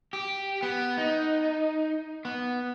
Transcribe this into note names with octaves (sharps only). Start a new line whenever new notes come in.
G4
B3
D#4
B3